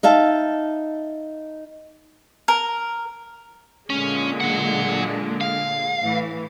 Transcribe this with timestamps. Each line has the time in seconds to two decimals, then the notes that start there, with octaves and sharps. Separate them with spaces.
0.03 D#4 E5 F5 A5
2.48 A#4
3.90 A#2 D3 G#3 C#4
4.41 F#3 F#5
5.41 F5
6.00 A2 E3